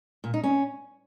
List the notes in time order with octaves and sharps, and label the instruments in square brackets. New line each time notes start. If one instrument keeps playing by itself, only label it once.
[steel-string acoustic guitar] A#2
D#4
C#4